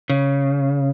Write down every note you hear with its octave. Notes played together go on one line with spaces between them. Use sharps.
C#3